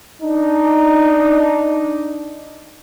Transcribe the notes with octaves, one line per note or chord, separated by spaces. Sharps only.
D4 D#4